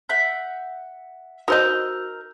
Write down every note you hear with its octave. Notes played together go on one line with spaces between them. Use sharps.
E5 F#5 G6
D#4 F#4 A#4 C5 D#5 E6 G6